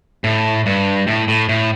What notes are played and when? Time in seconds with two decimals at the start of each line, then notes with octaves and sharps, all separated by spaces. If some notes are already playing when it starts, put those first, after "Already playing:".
0.24 A2
0.66 G2
1.07 A2
1.28 A2
1.49 A2